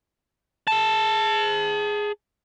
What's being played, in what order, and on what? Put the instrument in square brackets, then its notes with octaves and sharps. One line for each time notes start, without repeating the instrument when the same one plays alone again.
[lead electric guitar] G#4 A5